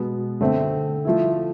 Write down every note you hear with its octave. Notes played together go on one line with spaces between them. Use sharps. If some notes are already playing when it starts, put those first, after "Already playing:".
Already playing: B2 G#3 B3
D3 A3 C4
F3 A3 E4